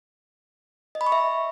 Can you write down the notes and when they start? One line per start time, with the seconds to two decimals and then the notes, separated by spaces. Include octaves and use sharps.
0.95 D#5
1.01 B5
1.06 C#6
1.12 E5